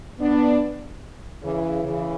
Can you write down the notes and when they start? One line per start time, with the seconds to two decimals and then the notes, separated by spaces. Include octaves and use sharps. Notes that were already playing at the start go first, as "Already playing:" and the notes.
0.19 B3 D4
1.43 C#3 E3
1.84 C#3 E3